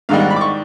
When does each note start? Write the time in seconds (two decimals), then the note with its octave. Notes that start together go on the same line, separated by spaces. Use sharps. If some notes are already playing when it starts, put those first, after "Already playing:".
0.09 G#2 D#3 G3 F5
0.20 F#5
0.30 B5
0.36 D6
0.41 C#6